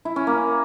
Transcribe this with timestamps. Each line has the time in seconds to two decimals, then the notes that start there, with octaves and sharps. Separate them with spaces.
0.05 E4
0.16 C#4
0.27 A#3